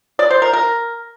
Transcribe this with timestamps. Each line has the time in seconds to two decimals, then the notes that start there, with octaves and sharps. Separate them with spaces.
0.19 D5
0.30 C5
0.42 A#4
0.53 A#4